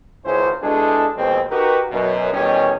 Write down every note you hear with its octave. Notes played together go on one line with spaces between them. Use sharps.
G#1 C#2 C#3 C#4 E4 C5
B2 G#3 D4 E4 G#4 A4
D#2 B2 F3 G#3 C4
D#4 F#4 G4 A#4 B4
F#2 B2
E2 B2 D#3 G3 C#4